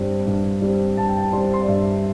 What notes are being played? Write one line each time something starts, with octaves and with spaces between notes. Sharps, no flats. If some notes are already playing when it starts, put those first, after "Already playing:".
Already playing: G2 G3 C4
G2
G3 C4
G2 A5
G5
A5
G3 C4 C6
C6
D5
G2 E5